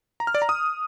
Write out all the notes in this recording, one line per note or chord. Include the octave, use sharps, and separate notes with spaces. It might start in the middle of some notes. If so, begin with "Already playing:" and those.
A#5
F6
D5
A#5
D#6